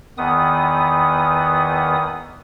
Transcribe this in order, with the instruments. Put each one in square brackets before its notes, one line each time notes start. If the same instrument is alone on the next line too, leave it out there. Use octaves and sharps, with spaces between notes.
[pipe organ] E2 D#3 B3 D#6